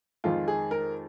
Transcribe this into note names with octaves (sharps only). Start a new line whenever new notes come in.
F2 D#3 G#3 F4
G#4
A#4